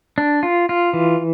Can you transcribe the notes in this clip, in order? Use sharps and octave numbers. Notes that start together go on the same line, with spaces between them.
D4
F4
F4
E3